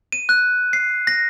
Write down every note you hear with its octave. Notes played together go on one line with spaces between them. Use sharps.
D#7
F#6
C7
A#6